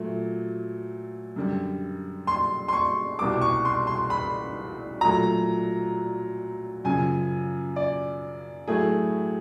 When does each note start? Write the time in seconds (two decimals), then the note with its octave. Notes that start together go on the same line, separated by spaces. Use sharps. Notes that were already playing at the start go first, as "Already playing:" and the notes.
Already playing: A#2 F#3 A3
1.36 F#2 D3 G3
2.27 C6
2.68 C6
2.73 C#6
3.19 C2 B2 G3 D6
3.41 C#6
3.65 C6
3.87 C6
4.10 B5
5.01 A#2 F#3 A3 A#5
6.84 F#2 C#3 F3 G#5
7.76 D5
8.68 A2 F#3 A3 G#4